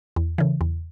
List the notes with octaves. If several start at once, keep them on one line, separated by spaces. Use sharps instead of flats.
E2
C#3 E3
E2